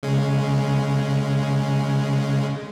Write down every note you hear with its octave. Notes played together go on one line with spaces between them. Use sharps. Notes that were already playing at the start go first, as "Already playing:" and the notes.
C#3 G#3